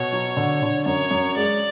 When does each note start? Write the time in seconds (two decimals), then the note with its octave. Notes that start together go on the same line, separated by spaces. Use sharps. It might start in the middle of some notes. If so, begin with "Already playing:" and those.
Already playing: B2 C#5
0.13 F#3
0.37 D3
0.62 D3
0.86 F#2 C#5
1.11 F#2
1.36 G#3 D5